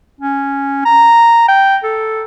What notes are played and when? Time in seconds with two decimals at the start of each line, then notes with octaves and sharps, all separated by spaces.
0.21 C#4
0.85 A#5
1.48 G5
1.84 A4